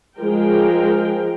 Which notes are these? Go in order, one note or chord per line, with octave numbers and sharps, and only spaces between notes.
F3 G#3 A#4 G5